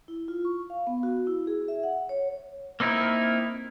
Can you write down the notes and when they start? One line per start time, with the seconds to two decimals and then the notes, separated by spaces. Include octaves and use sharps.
0.08 E4
0.28 F4
0.45 C#6
0.70 F5
0.87 B3
1.03 F#4
1.27 E4
1.47 G#4
1.68 E5
1.83 F#5
2.09 C#5
2.80 A#3 C4 D#4 E4 A#4